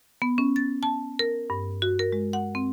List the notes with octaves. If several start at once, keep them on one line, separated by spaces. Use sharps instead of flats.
B3
C#4
A6
A5
A#4
G2
F#4
A#4
G#3
F#5
C4